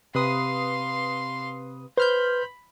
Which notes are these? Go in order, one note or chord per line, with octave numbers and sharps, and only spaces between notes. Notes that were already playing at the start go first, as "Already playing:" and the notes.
C3 B4 F5 C6 D#6
B4 C5 B5 F6 G6